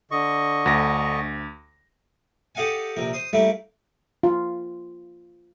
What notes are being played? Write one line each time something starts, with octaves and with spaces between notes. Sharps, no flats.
D3 D#5 C#6
D2 A#6
G4 A4 D#5 F5 F#5 G#5
A#1 C3 A#4
C5 C6 D#6
G3 A3 A#3 E4
F4